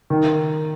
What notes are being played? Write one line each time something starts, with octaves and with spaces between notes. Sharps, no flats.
D#3